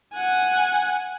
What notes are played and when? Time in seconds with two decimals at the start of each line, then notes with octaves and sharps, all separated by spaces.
0.13 F#5 G#5